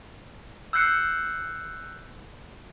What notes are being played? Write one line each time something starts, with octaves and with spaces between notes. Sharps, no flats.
E6 F#6 G6 C7 C#7